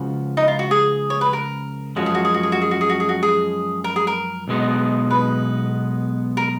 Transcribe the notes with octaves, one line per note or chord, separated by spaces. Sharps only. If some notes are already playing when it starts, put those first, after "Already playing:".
Already playing: C#2 C#3 F3 F#4
D#4
F4
F#4
G#4
C#5
B4
A#4
F#2 F3 G#3 C#4 F#4
G#4
F#4
G#4
F#4
G#4
F#4
G#4
F#4
G#4
F#4
G#4
F#4
G#4
A#4
G#4
A#4
B1 B2 G#3 B3 D#4
B4
A#4